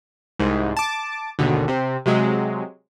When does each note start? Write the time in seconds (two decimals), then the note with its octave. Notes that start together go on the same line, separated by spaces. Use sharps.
0.39 C2 G#2
0.77 A5 D6
1.39 G#1 D#2 B2 D3
1.68 C3 C4
2.06 C3 F#3 G#3